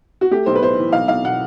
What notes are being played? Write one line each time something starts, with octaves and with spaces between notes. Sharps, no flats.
F#4
A3 G4
B1 C5
B4
A2 C5
E3
B1 F5
B1 F5
B2 F#5